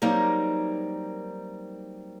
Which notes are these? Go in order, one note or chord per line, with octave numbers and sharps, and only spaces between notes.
F#3 G3 A#3 C4 D#4 A#4